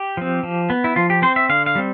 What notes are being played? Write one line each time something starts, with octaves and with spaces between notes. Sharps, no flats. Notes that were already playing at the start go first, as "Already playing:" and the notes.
Already playing: G4
F3 C4
F3
B3
E4
F3 F4
G4
C4 C5
E5
D3 F5
F5
G3 C4